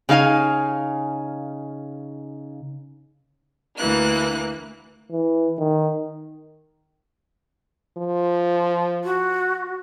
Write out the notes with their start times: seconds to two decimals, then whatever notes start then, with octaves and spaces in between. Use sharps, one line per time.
0.09 C#3 D#4 F5 G#5
3.77 D2 E3 A#3 F#6
5.11 E3
5.59 D#3
7.97 F3
9.04 F#4